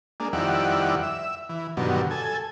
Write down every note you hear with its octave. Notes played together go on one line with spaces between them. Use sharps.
G#3 A#3 D4
F2 D#3 G3 E4 D5 F#5
E5
E3
G2 B2 D3 D#3 F#3
A4 G#5